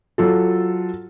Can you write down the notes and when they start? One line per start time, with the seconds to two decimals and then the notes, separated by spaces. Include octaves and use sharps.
0.18 F#3 F4 A4